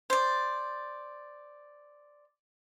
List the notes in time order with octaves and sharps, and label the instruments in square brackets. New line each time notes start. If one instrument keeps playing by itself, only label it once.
[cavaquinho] C5 D5